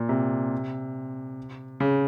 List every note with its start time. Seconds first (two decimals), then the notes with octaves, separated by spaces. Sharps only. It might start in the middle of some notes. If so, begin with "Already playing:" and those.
Already playing: A#2
0.09 C3
1.80 C#3